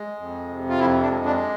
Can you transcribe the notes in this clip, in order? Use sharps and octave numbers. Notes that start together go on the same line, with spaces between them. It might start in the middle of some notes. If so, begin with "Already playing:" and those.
Already playing: G#3
F2
C3
F4
F2 E4
D4
G#3
D4